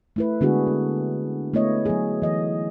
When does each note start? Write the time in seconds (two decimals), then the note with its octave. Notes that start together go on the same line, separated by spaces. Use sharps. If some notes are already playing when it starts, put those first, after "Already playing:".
0.16 A3 E4 B4
0.41 D3 G#3 B3 D4 F#4 G#4
0.67 A#3
1.54 A3 B3 E4 C#5 D#5
1.85 F#3 G#4
2.22 E3 D#5